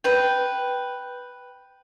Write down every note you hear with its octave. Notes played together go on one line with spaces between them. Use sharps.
B4 G5